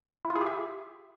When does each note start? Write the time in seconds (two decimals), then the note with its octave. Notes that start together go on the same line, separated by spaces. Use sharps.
0.25 E4
0.30 F4
0.36 G#4
0.41 G4
0.46 E5